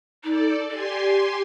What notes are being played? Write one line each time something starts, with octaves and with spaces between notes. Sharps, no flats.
D#4 A4 D5
G4 D5 G#5 C6